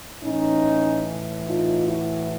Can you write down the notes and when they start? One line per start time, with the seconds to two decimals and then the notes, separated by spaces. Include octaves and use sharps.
0.23 A2 E3 C#4 D#4
1.46 D#4 F4
1.87 E4 F#4